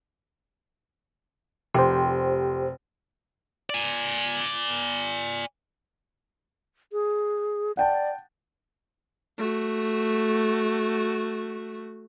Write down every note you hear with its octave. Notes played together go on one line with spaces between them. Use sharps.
F1 G4 C5
D5 G#5
G#4
D5 F#5 G5 A5
A3 F#4